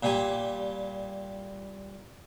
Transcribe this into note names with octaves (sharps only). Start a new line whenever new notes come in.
A#2 G3 G#5